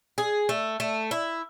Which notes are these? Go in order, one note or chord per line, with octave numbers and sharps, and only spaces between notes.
G#4
A3
A3
E4